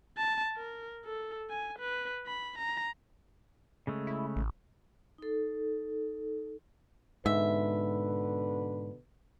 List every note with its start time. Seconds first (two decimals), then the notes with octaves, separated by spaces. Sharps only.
0.18 A5
0.57 A#4
1.05 A4
1.50 G#5
1.79 B4
2.27 B5
2.58 A#5
3.87 C#3 G#3 A3
4.07 E4
4.36 A1
5.18 D#4 A4
7.26 G#2 B2 D3 B4 E5